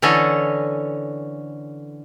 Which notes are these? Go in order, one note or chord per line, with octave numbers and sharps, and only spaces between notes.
D3 E3 C#4 A4 C#5 D#5